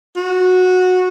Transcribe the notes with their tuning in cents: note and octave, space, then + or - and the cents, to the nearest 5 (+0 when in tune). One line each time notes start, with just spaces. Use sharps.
F#4 -15